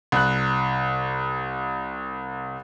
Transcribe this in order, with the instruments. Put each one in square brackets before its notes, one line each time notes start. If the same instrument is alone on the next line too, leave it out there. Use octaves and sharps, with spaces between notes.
[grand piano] C2 F#6